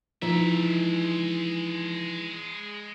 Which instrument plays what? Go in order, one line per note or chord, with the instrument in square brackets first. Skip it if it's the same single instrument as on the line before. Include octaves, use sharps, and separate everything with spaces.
[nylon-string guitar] E3 D#4 [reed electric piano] F3 [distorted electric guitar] G#3 E5